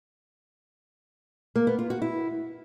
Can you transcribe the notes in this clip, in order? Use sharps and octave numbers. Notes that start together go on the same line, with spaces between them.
A#3
B3
F4
F#4
E4